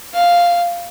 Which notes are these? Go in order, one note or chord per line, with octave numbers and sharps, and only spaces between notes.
F5